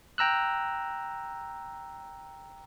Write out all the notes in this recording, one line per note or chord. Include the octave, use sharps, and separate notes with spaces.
G5 A#5 E6 F#6